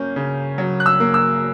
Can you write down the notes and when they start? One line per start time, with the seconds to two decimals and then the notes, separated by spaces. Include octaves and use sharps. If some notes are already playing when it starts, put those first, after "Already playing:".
Already playing: F#3 A#3 C#4 G6
0.16 C#3
0.58 F#3
0.80 F#6
0.86 E6
1.00 A#3
1.14 E6